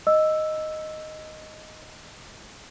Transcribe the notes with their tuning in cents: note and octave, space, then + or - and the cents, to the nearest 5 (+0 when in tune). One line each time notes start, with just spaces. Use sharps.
D#5 +0 E6 +0